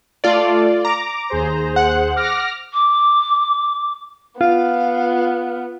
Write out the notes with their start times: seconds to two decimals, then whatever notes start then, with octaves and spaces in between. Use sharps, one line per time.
0.24 A3 F4 A4 D5
0.85 A#5 D6
1.30 D#2 G#4 C5
1.76 F#5
2.16 D6 F6 A#6
2.73 D6
4.41 B3 F4 F5